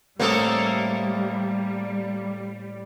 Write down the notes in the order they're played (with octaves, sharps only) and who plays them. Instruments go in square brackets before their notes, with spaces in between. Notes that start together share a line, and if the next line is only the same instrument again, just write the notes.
[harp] A2 C4 D#6 [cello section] G3 [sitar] A#3 A4 A#4